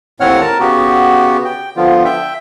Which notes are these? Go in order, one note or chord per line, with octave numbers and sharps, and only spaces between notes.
D#2 A2 C4 C#5 F#5 F6
A#4 A5
C#3 B3 F#4 G4
G5
D3 F3 B3 F4
E5 G5